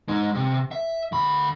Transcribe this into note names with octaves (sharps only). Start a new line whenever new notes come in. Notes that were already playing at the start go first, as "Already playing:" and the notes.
G#3 D#4
C3
E5
D2 B5